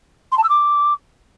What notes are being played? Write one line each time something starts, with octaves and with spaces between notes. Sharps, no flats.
C6
A5
E6
D6